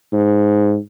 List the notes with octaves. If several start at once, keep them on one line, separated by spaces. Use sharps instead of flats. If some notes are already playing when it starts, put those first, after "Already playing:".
G#2